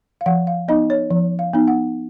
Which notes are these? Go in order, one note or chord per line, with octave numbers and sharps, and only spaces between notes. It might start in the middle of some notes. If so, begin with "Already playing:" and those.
F5
F3 F#5
F5
B3 D#4 D#5
C#5
F3
F5
B3 D#4
F#5